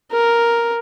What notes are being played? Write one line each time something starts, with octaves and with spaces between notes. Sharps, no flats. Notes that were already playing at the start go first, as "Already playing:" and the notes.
A#4